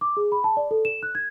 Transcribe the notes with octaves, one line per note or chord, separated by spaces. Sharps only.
D6
G#4
B5
A5
D5
A4
E7
F#6
G#6